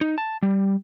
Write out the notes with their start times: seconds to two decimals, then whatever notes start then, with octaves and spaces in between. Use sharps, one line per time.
0.01 D#4
0.18 A5
0.43 G3